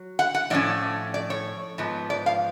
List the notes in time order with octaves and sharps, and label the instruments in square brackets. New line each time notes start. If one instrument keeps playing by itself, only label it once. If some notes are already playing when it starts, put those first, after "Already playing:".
Already playing: [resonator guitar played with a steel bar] F#3
F#5
F#5
A2 F3 A3 C#4 D5
D5
C#5
G#2 F3 B3
D5
F5